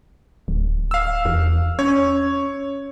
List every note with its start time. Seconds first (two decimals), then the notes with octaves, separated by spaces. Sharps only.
0.48 D1
0.91 F5 E6
1.25 E2
1.79 C#4 C#5